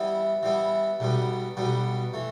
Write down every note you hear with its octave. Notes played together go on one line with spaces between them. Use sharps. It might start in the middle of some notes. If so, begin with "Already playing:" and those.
Already playing: E3 G3 B3 E4
E3 G3 B3 E4
B1 B2 G3 B3
B1 B2 G3 B3
E3 A3